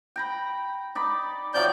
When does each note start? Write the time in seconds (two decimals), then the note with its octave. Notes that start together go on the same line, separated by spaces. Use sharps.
0.16 G5 A#5 B5
0.95 D#4 D5 B5
1.54 C3 F3 F#3 D5 G6